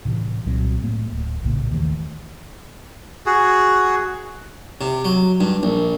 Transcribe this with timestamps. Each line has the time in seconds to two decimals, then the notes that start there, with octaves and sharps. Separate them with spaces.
0.05 A2 C3 E3
0.46 C2 A#2 F#3 C4
0.83 A2 A3 A#3
1.12 D1
1.43 A#1 A2 C#3 A#3
1.71 D#2 D#3 E3 A3
3.26 F#4 G#4
4.81 C3
5.05 F#3
5.40 G2
5.63 A#1